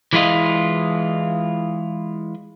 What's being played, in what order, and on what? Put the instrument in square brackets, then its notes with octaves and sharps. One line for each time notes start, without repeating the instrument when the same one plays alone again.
[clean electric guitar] E3 G#3 E4 F4 D#5